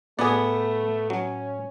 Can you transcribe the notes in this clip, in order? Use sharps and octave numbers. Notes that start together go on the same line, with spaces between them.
A2 A3 B3 G#4 D5
F#3 C#4